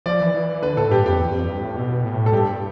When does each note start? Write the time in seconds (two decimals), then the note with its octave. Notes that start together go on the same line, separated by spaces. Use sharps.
0.06 F3 D5
0.21 E3
0.34 E3
0.49 E3
0.63 D3 B4
0.77 A2 A4
0.91 G2 G4
1.05 F2 G4
1.19 E2
1.33 F2
1.48 G2
1.61 A2
1.77 B2
2.05 A2
2.26 A4
2.33 G2 G4